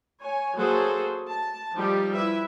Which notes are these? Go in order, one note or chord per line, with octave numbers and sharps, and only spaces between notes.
C#5 G#5
F#3 A#3 F#4 G#4 A4 C5
A5
F3 G3 D#4 G4
E4 B4 E5